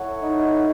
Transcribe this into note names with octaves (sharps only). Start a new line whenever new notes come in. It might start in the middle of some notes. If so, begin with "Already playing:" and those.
Already playing: E4 A4 C#5 F#5
D#4